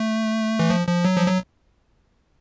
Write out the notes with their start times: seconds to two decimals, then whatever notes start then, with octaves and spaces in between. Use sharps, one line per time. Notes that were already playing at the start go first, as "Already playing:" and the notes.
Already playing: A3
0.59 E3
0.70 F3
0.87 F3
1.05 F#3
1.17 F3
1.27 F#3